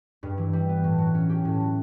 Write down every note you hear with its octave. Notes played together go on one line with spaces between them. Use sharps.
G2
E3
G3
B3
A2
F#3
C#4
G4
A2
F#3